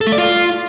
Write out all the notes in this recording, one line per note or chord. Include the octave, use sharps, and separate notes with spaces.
A4
A3
D5
F4